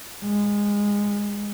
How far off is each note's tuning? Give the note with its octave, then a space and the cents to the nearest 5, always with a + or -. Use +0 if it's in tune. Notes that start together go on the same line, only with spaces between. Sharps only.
G#3 -20